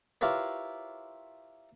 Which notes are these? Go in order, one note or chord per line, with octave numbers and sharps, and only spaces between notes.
E4 F4 G4 A#4 B4 C#5